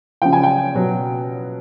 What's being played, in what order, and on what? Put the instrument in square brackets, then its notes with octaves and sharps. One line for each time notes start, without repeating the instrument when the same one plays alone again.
[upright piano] C#3 F3 G5
G#5
G5
B2 F#3